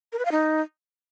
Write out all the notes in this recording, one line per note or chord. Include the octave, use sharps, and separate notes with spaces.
A#4
B4
F5
D#4